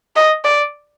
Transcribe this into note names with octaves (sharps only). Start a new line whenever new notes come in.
D#5
D5